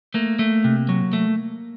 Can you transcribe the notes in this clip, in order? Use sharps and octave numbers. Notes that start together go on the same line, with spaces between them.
A3 A#3
A3
C3
F#3
A3